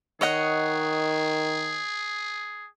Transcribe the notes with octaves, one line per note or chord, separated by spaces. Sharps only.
D#3 G#4 C#5 D#5 F#5